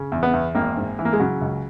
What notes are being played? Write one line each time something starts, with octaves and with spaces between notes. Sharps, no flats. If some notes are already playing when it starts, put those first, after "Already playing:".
Already playing: C#3
E2
B3
E2
G#1 A#3
G#2
E3
A#3
G#3
C#3 F#3
C#2